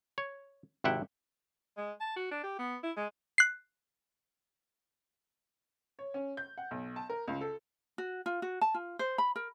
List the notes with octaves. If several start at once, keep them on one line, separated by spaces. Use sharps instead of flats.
C#5
G#1 C3 E4 E5 F#5 G5
G#3
A5
F#4
D4
G4
B3
E4
G#3
F#6 C7
C#5
C#4
G6
F#5
B1
A5
A#4
C#2
A4
F#4
F4
F#4
A5
F4
C5
B5
A#4